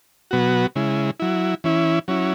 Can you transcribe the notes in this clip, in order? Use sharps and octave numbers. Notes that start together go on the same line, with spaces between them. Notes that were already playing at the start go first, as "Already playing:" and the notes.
B2 F#3 B3 F#4
C#3 G#3 E4
F#3 E4
E3 C#4 E4
F#3 C#4 E4